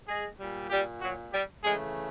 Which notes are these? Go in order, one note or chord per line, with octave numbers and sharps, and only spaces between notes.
G#3 G#4
A#2 G3
G3 G4
F#3 F#4
G3 G4
C#3 E3 G#3 A3 G#4